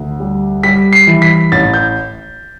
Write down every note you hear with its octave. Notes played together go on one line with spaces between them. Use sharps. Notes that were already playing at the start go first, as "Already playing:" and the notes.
Already playing: D2
G3
G3 B6
C7
E3
B6
A1 A6
G6